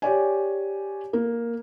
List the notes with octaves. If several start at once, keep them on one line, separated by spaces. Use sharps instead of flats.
G4 C#5 D5 G#5
A#3